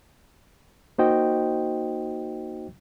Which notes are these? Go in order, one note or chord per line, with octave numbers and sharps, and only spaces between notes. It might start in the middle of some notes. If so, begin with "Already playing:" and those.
A#3 D#4 F#4 C5 D#5 G5